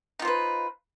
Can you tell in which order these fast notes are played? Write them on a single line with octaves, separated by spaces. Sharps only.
D#4 F4 C5 B4